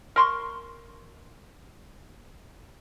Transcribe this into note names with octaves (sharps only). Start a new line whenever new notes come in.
A#4 C6 C#6